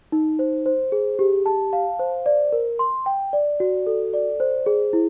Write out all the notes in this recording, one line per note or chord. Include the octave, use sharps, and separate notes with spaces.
D#4
C5
C5
G#4
G4
A5
F5
C5
D5
A#4
C6
G5
D5
F#4
A4
D5
C5
G#4
E4